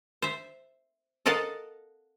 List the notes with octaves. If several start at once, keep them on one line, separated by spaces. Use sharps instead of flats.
C5 E5
A4 A#4 D#5 F5 F#5 A5